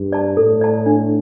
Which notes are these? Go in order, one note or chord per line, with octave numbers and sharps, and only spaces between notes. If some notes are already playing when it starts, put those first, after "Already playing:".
Already playing: G2
D5 A5
A2 A4
D5 A5
D4